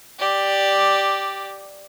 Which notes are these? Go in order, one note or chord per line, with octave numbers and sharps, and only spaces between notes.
G4 D5